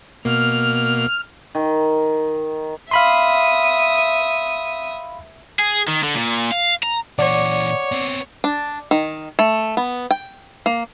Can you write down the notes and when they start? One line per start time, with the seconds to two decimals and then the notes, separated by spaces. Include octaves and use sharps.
0.25 B2 A#3 F6
1.55 D#3
2.91 E5 F5 B5 C6 D#6
5.59 G#4
5.88 D#3
6.04 D3
6.16 A#2
6.52 F5
6.83 A#5
7.19 A#2 E3 C#5 D5 F#5 D6
7.92 B3 C4
8.44 D4
8.91 D#3
9.39 A3
9.77 B3
10.10 G5
10.66 A#3